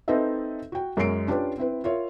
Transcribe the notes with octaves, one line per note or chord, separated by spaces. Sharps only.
C4 D#4 A4 B4 D#5 E5
F#4 G5
F#2 G#3 C#4 C7 D7
C#4 D4 F4 G4 B4
C4 E4 B4
F4 A#4 C#5 E5